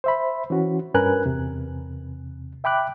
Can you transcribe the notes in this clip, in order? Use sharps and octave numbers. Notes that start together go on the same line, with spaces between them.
C5 E5 B5
E3 C#4 F#4
G2 C#4 A#4 B4 G#5 F#6
E2 C3
E5 G5 B5 D6 F#6